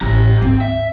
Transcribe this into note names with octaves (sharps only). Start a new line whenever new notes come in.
A1 G4 A#5
D#2 G#2 C4
E5